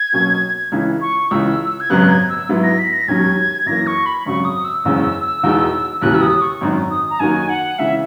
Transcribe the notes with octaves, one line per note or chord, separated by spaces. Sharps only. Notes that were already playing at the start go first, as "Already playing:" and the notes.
Already playing: G#6
B1 B2 F#3 A#3 C#4
C#2 C#3 E3
C#6
C#2 C#3 E3 E6
G#6
G#1 F#2 C#3 F#3 B3 F#6
G#6
E6
G#2 F#3 B3 E4
A#6
B6
A#6
E1 D#2 D#3 F#3 C#4 G#6
F#2 E3 A#3 A#6
C#6
B5
G#1 F#2 C#3 F#3 C#6
D#6
E6
F#1 E2 C#3 G#3 C#4
E1 E2 B2 G#3 D#4
E1 D#2 C#3 E3 F#6
E6
D#6
C#6
G#1 F#2 D#3
D#6
A#5
F#2 D#3 A#3 D#4 F#4 G#5
F#5
C#2 C#3 E3 E5